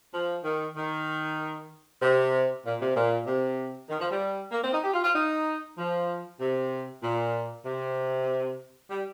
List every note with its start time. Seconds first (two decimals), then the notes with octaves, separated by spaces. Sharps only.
0.14 F3
0.44 D#3
0.76 D#3
2.02 C3
2.65 A#2
2.80 C3
2.95 A#2
3.27 C3
3.89 D#3
3.99 F3
4.10 G3
4.51 A#3
4.63 C4
4.73 D#4
4.84 G4
4.94 F4
5.04 F4
5.15 D#4
5.77 F3
6.40 C3
7.03 A#2
7.65 C3
8.90 G3